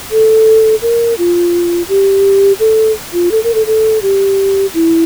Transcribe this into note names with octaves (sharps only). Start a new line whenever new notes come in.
A4
A#4
F4
G4
A4
F4
A4
A#4
A4
A4
G4
E4